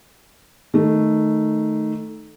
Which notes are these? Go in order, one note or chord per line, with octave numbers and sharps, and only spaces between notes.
D#3 A3